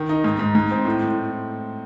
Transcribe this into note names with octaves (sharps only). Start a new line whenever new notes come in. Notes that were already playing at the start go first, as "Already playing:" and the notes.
Already playing: D#3
D#4
G#2
G#2
G#2
C4
A2
A2